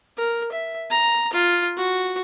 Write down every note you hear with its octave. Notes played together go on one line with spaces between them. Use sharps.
A#4
E5
A#5
F4
F#4